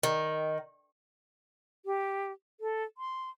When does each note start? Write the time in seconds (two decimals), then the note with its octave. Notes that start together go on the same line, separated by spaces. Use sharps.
0.03 D#3
1.85 G4
2.60 A4
2.98 C6